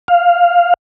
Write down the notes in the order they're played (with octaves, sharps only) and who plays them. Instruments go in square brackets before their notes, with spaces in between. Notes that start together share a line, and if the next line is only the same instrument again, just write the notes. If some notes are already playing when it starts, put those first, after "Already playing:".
[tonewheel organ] F5